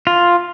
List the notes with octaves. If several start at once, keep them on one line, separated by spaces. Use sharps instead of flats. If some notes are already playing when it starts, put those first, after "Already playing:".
F4